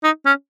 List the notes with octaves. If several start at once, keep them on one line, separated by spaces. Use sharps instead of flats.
D#4
C#4